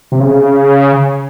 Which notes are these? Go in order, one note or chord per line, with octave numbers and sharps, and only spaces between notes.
C3
C#3